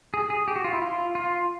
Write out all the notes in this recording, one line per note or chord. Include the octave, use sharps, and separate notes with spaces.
G#4
G#4
G4
F#4
F4
E4
F4
F4